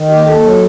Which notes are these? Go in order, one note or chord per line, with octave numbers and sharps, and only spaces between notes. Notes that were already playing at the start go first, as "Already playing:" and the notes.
Already playing: D#3
D#2 G4
D#2 A4
F#3